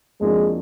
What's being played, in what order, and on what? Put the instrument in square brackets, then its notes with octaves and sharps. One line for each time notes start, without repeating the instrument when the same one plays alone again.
[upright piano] F2 F3 A#3 D4 F#4 [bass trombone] G#3